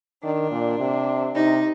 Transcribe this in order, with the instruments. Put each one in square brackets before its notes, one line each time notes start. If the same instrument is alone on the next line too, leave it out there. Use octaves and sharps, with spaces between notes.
[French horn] D#3 [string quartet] D4
[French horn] A#2
C3
[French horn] C3 [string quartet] D#4